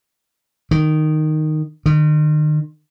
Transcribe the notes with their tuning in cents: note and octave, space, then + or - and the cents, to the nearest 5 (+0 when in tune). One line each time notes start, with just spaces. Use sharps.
D#3 -10
D#3 -40